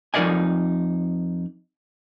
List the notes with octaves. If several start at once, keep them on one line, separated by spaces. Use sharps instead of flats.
F2 D#4 A#4 D5 D#5 G#5